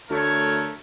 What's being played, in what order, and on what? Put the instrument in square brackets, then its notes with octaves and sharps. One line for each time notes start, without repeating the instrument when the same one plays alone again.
[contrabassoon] D2 [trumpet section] A3 A#4 C#5